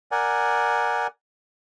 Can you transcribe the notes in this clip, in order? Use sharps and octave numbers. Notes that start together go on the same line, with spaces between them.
A#4 D5 F#5 G#5